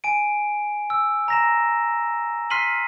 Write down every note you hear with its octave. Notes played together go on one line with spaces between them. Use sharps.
G#5 D7
E6
A#5 A#6 E7
C6 F6 B6 C7 D#7 F#7